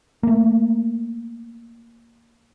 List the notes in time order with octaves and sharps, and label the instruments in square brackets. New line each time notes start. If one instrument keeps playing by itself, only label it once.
[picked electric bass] A3 A#3